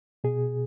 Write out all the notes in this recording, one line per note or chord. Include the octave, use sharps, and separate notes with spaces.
B2 G#4